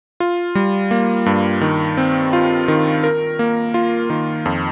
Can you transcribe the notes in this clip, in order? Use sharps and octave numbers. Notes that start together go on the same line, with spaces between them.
F4
G3
A#3
G2
D#3
C4
F4
D#3
A#4
A#3
F4
D#3
F2